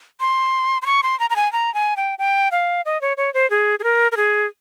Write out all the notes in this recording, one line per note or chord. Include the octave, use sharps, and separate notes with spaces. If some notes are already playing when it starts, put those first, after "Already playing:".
C6
C6
C#6
C6
A#5
A#5
G#5
A#5
G#5
G5
G5
F5
D#5
C#5
C#5
C5
G#4
G#4
A#4
A#4
G#4